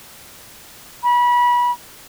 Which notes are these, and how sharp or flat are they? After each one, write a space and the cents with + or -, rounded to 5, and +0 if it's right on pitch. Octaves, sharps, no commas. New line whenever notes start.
B5 -30